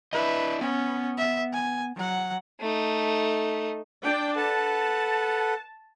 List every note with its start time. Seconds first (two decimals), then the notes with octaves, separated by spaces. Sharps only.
0.13 D4 E4 B4 D#5 E5
0.61 B3 C#4
1.18 E5
1.53 G#5
1.97 F#3 F#5
2.60 A3 D#4
4.03 D4 G5
4.36 A4 B4 F#5 A5